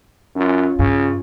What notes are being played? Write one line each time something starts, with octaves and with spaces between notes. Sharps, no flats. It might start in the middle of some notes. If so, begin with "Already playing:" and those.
F#2 C#4 F4
G2 C#3